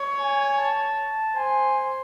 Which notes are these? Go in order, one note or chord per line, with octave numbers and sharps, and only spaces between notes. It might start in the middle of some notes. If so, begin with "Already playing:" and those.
Already playing: C#5
G#5
A5
C5 G#5